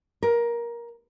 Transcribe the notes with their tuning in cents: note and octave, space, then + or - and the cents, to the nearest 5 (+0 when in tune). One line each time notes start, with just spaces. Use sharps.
A#4 +15